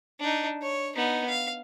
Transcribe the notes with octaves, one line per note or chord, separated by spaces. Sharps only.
D4 D#4
C#5
B3 D#4
F5